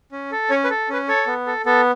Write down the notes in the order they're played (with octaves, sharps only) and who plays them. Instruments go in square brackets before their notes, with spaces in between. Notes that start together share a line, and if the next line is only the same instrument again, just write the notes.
[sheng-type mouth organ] C#4
A4
C#4 C#5
B4
A4
C#4 B4
A4 C#5
B3
A4
B3 A4